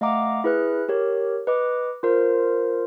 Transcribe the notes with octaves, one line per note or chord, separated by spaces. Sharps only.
A3 D#5 F5 F#5 A#5 D6
E4 G#4 B4 F6 F#6
G4 A#4 C#5
B4 D#5 D6
F4 A#4 C5